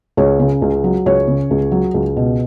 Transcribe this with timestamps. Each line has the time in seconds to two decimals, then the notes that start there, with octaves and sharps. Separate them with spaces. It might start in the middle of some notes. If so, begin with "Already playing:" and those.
0.17 C#2 C#5
0.39 C#3
0.62 C#2
0.84 F#3
1.06 C#2 C#5
1.27 C#3
1.51 C#2
1.72 F#3
1.94 C#2
2.17 B2